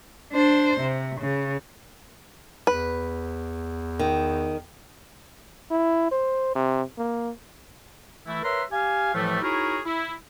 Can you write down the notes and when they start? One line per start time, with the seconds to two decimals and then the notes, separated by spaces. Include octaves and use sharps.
0.33 D4 C5
0.80 C3
1.20 C#3
2.67 E2 B4
3.99 D#3
5.71 E4
6.12 C5
6.55 C3
6.98 A#3
8.26 E3 A3 E4
8.43 A#4 B4 C#5 E5 A#5 C6
8.71 G4 F5 G#5
9.15 A2 E3 F3 G3 A3
9.42 D#4 E4 F#4 G#4 A#4 C#5
9.85 E4